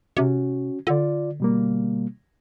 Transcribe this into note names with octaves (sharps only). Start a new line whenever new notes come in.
C3 C#4 F#4
D3 F4 D5
B2 G3 A#3